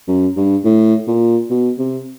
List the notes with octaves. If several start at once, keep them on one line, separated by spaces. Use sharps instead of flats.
F#2
G2
A2
A#2
B2
C3